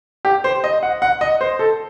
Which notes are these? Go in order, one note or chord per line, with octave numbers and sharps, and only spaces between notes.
G4
C5
D#5
F#5
F#5
D#5
C5
A4